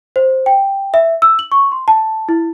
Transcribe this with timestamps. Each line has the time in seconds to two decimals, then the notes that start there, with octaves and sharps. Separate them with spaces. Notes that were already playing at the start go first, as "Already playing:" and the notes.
0.16 C5
0.46 G5
0.94 E5
1.22 E6
1.39 F#7
1.52 C#6
1.72 C6
1.88 A5
2.29 E4